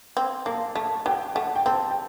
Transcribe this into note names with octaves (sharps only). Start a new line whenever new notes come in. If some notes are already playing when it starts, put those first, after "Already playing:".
C4
A#3 A5
A3 A5
F#3 G5
A3 F#5
G5
C4 A5
G5